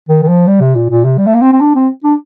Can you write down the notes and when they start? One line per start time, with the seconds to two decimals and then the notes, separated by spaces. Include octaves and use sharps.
0.08 D#3
0.23 D#3
0.28 F3
0.47 G3
0.60 C3
0.75 A#2
0.90 A#2
1.04 C3
1.18 G3
1.26 A3
1.34 A#3
1.41 C4
1.52 C4
1.60 D4
1.75 C4
2.04 D4